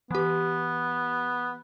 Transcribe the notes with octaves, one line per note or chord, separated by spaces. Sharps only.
E3 B3 G4